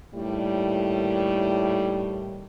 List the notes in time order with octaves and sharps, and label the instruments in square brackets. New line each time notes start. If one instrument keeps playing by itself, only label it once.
[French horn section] D#2 A2 G3